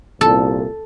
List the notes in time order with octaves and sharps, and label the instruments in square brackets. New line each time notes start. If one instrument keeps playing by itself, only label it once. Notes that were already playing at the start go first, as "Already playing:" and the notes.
[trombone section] C2 A#2 [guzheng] A4